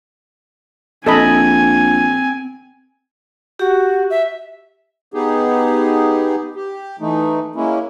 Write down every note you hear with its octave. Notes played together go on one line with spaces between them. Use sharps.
A#1 C4 A4 D#5 G#5 B5
F#4 G4
E5
B3 D#4 G4 G#4
G4
E3 A3 D#4
G#3 A#3 C#4 E4